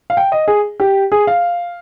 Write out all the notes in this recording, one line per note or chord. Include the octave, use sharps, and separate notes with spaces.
F5
G5
D#5
G#4
G4
G#4
F5